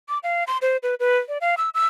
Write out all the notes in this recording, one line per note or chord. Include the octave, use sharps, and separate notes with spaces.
D6
F5
C6
C5
B4
B4
D5
F5
E6
E6